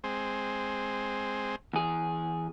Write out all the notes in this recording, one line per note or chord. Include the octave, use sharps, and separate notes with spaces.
G#3 C4
E2 G#4